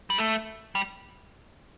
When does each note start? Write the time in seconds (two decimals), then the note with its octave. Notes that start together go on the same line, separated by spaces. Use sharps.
0.10 G3
0.18 A3
0.75 G3